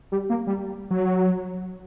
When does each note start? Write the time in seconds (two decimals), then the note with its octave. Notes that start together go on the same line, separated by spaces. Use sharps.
0.12 G3
0.30 A#3
0.47 G3
0.91 F#3